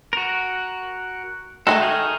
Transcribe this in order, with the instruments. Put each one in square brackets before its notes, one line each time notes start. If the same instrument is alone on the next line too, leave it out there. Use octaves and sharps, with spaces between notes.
[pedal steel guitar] F#4 A#4
[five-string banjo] D#3 A3 D#5 [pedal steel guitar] G#3 F#4 A4
[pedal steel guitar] D#4 G#4 F6